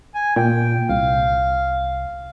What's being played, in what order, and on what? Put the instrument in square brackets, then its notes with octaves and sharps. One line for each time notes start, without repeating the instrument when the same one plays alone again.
[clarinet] G#5
[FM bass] A#2 [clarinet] G5
[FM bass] C2 [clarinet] F5